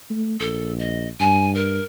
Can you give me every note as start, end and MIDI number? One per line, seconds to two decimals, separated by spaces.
0.10 0.38 57
0.40 1.09 34
0.40 0.73 69
0.79 1.08 75
1.20 1.79 43
1.20 1.53 80
1.55 1.84 70